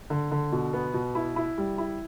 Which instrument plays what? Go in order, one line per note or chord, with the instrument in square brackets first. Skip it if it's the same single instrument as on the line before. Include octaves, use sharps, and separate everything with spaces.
[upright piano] D3
D3
B2
B3
B2
E4
E4
G3
E4